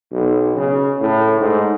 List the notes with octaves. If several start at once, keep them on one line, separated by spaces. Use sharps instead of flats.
B1
C#3
A2
G#2